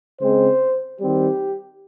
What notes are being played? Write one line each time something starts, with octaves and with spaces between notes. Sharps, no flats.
C#3 G#3 C4 C5
D#3 G3 C4 G4